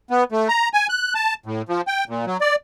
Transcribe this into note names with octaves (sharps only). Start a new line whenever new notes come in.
B3
A3
A#5
G#5
F#6
A5
A2
F3
G5
A#2
F#3
D5